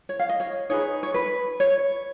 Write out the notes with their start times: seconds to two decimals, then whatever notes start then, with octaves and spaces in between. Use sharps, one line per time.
0.09 C#5
0.19 F5
0.29 D#5
0.40 C#5
0.70 D#4 G#4 B4 C#5
1.03 C#5
1.14 B4
1.60 C#5